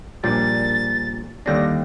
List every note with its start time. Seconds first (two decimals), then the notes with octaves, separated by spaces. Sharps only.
0.23 A#1 A#2 G3 D4 A6
1.46 D#2 D3 G3 D4 A#6